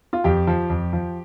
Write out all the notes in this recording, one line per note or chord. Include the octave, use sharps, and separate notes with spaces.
F4
F2 G4
F3
F2
F3